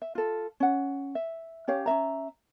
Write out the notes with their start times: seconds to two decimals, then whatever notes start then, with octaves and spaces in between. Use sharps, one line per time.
0.02 E5
0.15 F4 A4
0.60 C#4 F#5
1.15 E5
1.67 C#4 G4 C#5 F5
1.86 C#4 D4 E5 A#5